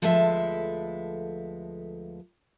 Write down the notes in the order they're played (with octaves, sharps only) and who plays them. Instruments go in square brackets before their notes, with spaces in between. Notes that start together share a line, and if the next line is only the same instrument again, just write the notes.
[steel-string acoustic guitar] D2 F3 G#3 A4 B4 E5